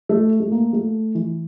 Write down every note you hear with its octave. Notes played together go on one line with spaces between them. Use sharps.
A3
A3
A#3
A3
E3